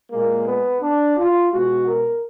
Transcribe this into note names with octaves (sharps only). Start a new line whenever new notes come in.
A#2 G#3 A#3
B3
D4
F4
B2 G#3 F#4
A#4